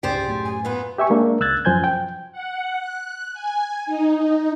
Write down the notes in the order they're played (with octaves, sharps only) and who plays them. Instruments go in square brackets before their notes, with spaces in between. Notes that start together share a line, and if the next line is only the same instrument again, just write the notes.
[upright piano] C#2 G#2 C6 [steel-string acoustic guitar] G4 G#4 C5 [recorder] D5
[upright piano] F#2 A2
[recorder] G#5
[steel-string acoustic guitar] A#2 B3 [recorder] B4
[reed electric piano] G4 E5 G#5 C#6
G#3 A#3 D4
C#2 E6 F#6 G#6 A6
F#2 F3 C5 G#5 G6 G#6
G5
[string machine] F#5
F#6
G#5
D#4